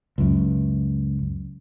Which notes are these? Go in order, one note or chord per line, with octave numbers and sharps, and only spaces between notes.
C#2 F#2